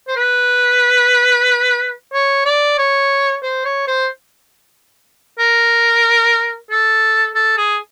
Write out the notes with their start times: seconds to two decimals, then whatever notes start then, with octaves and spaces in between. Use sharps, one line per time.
0.08 C5
0.16 B4
2.13 C#5
2.45 D5
2.78 C#5
3.43 C5
3.65 C#5
3.88 C5
5.39 A#4
6.71 A4
7.35 A4
7.58 G#4